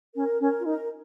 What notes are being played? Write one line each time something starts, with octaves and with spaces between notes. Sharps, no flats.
C#4 A#4
C#4 A#4
F4
D#4 A#4